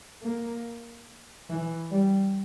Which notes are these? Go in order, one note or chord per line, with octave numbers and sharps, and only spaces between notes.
A#3
E3
G3